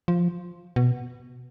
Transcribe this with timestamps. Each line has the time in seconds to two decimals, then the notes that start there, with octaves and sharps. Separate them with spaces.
0.08 F3
0.76 B2